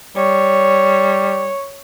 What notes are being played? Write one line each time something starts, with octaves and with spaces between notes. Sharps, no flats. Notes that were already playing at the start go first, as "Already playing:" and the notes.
G3 C#5